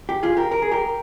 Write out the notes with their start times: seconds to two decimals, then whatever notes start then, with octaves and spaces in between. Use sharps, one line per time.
0.09 G4
0.23 F4 G#4
0.37 G4 A#4
0.51 A#4
0.62 G#4
0.71 G4 A#4